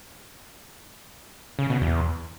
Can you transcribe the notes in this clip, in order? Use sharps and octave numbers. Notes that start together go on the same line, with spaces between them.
C#3
B2
E2